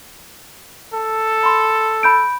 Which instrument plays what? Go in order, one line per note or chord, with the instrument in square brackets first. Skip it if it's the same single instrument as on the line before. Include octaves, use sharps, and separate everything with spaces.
[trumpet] A4
[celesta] B5 C6
B5 G6 D7